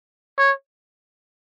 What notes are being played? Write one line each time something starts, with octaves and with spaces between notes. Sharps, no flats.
C#5